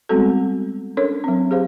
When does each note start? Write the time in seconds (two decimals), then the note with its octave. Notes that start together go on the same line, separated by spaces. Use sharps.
0.09 G3 G#3 B3 C4 F#4 A4
0.97 C#4 D4 A4 A#4 C#5
1.24 F#3 C4
1.51 G4 G#4 C5 F5